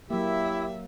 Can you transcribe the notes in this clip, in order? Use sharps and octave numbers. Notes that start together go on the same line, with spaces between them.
F#3 A#3 E4 G4 E5